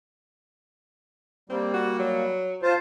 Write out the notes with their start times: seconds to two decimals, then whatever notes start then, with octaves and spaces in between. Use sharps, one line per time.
1.50 G3 A#3 C4
1.73 F#4
1.99 F#3
2.62 F4 C5 A5